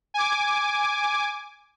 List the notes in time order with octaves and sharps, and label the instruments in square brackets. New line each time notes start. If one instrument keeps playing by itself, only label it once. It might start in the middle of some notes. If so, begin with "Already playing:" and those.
[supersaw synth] G#5 D6